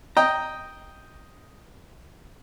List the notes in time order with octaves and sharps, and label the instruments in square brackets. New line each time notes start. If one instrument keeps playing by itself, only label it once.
[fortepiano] D#5 G5 [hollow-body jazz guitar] A#5